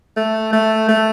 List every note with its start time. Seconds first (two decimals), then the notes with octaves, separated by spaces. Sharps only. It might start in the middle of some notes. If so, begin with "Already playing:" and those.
0.16 A3
0.53 A3
0.88 A3